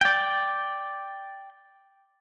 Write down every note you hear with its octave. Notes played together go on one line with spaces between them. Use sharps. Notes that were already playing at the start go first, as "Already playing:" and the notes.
D5 G5